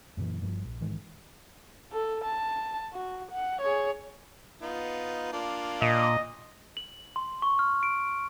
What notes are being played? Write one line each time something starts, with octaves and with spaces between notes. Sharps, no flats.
F#2 A#2 C#3 E3
G1 G2 C3 F3
A#1
A1 G#2 D#3 E3
A4
A5
F#4
F#5
G#4 C#5
B3 D#4 F4
A#3 D4 F4
A#2 D#5
F#7
C6
C#6
F6
D7